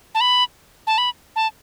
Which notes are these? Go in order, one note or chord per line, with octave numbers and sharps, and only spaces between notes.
A5
B5
A5
B5
A5